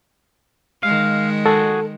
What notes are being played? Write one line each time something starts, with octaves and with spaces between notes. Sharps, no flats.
D#3 G#3 F5
F#4 G#4 A4